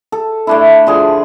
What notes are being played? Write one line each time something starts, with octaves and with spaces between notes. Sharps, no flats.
A4
A3 D4 E4
D3 F3 G#4